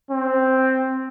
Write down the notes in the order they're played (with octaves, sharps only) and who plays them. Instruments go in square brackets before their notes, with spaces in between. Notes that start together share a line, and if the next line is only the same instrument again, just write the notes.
[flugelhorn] C4